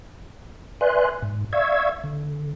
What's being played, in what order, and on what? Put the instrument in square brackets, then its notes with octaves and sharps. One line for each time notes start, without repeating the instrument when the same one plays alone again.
[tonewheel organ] B4 D5 E5 G#5 C6 F#6
G#2
D5 E5 F5 C#6 E6 G#6
D3